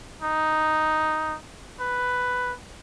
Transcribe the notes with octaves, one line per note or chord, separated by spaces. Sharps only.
D#4
B4